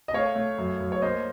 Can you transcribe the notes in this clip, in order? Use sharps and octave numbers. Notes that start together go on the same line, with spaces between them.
D#5
A3 C#5 F5
A3
F#2
F#2
C#5
A#3 C5 D#5